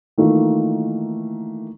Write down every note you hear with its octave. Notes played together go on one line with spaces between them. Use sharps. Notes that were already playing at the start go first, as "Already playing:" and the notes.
D#3 E3 A3 A#3 D#4 F4